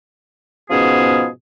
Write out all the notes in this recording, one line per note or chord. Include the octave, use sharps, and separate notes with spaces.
G#2 B2 F3 B3 C#4 G#4